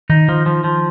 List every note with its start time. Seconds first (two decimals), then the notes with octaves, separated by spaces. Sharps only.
0.10 D#3 D#4
0.28 D#3 F3
0.46 F3
0.64 F3